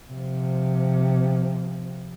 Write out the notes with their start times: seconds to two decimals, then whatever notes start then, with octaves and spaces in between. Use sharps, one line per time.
0.10 C3 F3